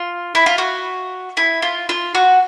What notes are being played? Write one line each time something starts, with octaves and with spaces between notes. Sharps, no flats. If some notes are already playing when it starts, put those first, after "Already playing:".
Already playing: F4
E4
F4
F#4
E4
F4
F4
F#4